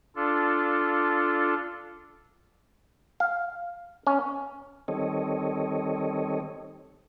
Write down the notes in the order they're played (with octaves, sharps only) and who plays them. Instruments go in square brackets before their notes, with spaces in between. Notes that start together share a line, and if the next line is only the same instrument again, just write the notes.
[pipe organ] D4 F4 A4
[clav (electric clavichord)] F5
C#4
[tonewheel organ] D#3 G3 C4 A4 C#5 D#5